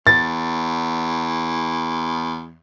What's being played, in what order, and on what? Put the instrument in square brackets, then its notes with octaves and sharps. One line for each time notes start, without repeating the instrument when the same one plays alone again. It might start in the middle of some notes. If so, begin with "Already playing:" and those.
[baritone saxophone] E2 [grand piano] A6